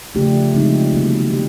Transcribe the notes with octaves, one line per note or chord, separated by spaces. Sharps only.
C#3 F3 A3 D4 G4
C#3 F3 G#3 C4 D#4
C3 D#3 F#3 A#3
D4 G4